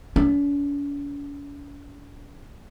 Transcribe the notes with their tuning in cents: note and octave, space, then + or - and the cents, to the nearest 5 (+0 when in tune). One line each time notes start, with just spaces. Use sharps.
C#4 +45